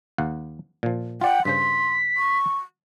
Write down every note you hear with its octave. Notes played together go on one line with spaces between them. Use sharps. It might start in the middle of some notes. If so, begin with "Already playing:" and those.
D#2 F5 F#5
A#2 F3
F4 D5 F#5 G5
G2 C#3 C5 C6 B6
C#6